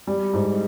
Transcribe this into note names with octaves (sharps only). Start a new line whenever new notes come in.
G3
G#2